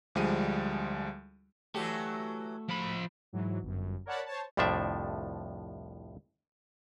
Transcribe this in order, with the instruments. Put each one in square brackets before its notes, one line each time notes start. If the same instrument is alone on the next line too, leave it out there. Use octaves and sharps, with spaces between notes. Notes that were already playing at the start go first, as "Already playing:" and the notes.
[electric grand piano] D2 F3 G3 G#3 D#7
[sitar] E3 F#3 G4 [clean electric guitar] A3 F#4 A4
[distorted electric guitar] F3 B5
[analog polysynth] G#2 E3 F#3
G1 F#2
A#4 C#5 D5 F#5 A5 B5
C5 C#5 A5
[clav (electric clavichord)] C2 F2 A2 F3 D4 E5